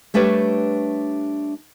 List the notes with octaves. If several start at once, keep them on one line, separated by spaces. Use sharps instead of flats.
G3 A3 D4 G4 B4 C#5